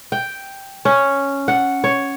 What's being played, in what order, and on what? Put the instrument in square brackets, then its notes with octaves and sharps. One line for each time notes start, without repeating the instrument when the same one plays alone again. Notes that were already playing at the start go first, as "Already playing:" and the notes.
[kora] G5
C#4
F#5
C#5